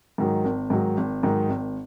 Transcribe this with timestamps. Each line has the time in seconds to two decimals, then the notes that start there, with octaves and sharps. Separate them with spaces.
0.18 G#2 D#3 F#3
0.45 G#1
0.70 G#2 D#3 F#3
0.97 G#1
1.23 G#2 D#3 F#3
1.49 G#1